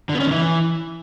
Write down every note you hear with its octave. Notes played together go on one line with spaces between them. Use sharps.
D3
B3
C#4
D#3
E3